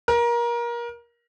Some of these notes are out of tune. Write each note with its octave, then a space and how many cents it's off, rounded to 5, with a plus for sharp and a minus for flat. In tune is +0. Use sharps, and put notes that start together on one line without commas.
A#4 +25